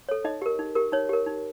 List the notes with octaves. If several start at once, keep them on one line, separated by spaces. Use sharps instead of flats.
A4 C#5
D#4 D#5
G4 A#4
D#4
G4 A#4
D#4 C#5
G4 A#4
D#4